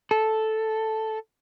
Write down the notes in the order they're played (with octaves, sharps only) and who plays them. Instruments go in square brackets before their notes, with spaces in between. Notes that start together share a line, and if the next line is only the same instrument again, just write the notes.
[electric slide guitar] A4